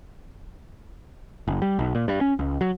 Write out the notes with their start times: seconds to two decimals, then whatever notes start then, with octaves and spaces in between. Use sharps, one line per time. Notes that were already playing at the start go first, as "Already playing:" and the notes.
1.48 F#1
1.62 G3
1.79 B1
1.95 A#2
2.08 G2
2.21 C#4
2.39 C#2
2.61 F#3